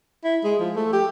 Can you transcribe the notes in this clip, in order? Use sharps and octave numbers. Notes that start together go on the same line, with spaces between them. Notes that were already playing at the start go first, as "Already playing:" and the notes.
E4
G#3
F3
A3
G4